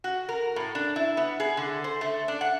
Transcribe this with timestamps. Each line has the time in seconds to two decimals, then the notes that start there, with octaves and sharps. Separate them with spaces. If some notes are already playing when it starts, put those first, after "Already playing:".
0.04 F#4
0.29 A#4
0.56 A2
0.75 D4
0.96 E4
1.17 B3
1.40 G#4
1.57 D3
1.84 C5
2.01 A3
2.28 D4
2.41 F#5